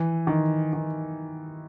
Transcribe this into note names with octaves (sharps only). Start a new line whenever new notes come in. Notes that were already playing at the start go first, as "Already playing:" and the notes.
Already playing: E3
D#3
D#3